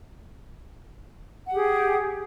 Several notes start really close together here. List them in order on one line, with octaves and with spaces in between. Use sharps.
F#5 G4 G#4